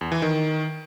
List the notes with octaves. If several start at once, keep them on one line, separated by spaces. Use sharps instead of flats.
E2
E3
D#3